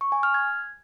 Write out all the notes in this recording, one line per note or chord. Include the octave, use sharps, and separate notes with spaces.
C#6
G#5
F6
G#6